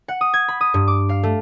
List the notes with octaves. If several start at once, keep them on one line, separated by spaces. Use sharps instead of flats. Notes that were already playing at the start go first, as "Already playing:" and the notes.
F#5
D#6
G#6
B5
D#6
G2
D6
F5
A3